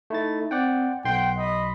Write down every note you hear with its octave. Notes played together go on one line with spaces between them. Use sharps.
A3 D#4 E4 A6
C4 D5 F#5 G5
B1 F#5 G5 C6
D#5 B5